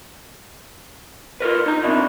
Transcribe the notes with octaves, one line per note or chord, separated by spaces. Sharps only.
F4 A#4 B4
D#4 A#5
B2 C4 D4 E4